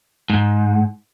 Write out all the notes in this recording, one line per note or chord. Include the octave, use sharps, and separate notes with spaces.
G#2